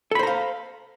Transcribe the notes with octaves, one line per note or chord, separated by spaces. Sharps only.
A4 C5 F5 A#5 B5